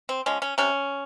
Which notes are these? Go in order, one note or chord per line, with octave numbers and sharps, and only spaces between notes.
C4
F3 G#3 C#4
C#4
C3 C#4